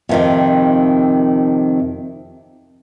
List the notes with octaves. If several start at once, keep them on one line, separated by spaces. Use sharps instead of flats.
F2 C3 D#3